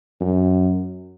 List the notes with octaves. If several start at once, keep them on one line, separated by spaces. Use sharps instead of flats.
F#2